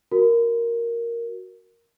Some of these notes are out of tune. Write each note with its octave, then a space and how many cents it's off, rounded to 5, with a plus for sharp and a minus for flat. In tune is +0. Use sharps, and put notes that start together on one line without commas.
F#4 +0 A#4 +0